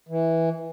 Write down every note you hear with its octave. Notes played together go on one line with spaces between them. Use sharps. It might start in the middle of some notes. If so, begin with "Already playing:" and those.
E3